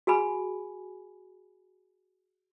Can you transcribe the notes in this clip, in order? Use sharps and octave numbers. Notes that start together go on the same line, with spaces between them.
F#4 G#4 G#5 B5